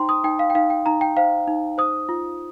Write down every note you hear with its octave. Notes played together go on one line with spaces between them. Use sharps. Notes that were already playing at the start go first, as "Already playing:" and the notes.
Already playing: D#4 C5 G5 A#5 C6
D#6
D#4 G5
F5
G5
D#4 F5
G5
D#4 A#5
G5
C5 F5
D#4
C5 D#6
F4